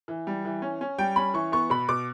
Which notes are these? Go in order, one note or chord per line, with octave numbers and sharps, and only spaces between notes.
E3
G3
E3
C#4
C#4
G3 G5
C#4 B5
E3 C#6
B3 C#6
B2 B5
B2 D6